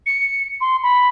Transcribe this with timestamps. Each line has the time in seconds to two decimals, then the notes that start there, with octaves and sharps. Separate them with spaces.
0.06 C#7
0.61 C6
0.83 B5